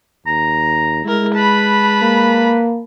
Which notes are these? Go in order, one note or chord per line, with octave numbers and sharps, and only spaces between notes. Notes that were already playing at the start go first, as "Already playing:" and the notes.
D#2 A#5
G#3 E4 A#4
B4 A5 B5
A#3